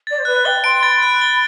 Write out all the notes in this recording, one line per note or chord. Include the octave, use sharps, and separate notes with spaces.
D5 A6
C5
B4 F#6
G5 G7
C6 D7
B5 A6
F#6
G7